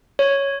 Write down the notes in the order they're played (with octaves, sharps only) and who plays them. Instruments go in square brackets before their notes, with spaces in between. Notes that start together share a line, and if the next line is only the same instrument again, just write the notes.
[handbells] C#5